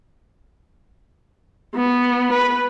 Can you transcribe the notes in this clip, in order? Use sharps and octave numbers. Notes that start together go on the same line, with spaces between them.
B3
B4